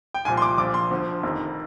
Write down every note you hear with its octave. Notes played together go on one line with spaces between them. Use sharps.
G5
C2 A#2 F3 G#5
C6
D6
A#1 A#2 F3 D6
C6
D2 D3 F3
F1 F2 D#3